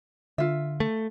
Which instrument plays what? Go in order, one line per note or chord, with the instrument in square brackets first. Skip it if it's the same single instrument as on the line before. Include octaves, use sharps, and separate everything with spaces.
[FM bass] D3 [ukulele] F4 E5
[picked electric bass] A3